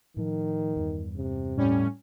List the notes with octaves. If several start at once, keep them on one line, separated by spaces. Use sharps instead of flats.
A2 D#3 F3
E2 G2
C3
A2 G3 C#4